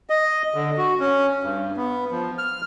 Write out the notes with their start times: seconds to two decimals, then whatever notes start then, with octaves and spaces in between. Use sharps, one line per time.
0.10 D#5
0.55 D3
0.77 F#4
1.00 C#4
1.44 G2
1.77 B3
2.11 F3
2.38 F6